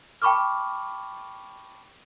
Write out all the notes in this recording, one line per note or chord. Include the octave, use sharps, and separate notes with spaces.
G5 A5 B5 C#6 D6 F6